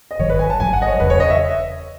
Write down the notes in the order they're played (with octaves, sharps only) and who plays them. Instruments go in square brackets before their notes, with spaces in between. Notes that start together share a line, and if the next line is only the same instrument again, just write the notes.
[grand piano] D#5
[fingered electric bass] G#1 G#2 D#3 F#3 [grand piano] C#5
[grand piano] B4
G#5
A5
[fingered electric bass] G#1 G#2 D#3 F#3 [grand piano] G#5
[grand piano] F#5
D#5
C#5
[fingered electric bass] E1 E2 C#3 [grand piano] B4
[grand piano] C#5
D#5
E5